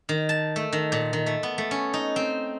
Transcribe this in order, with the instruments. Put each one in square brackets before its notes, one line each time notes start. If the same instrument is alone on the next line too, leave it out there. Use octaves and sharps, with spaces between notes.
[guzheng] D#3
A5
A3
D#3
A#2
D#3
A3
B3
A3
C#4
D#4
C4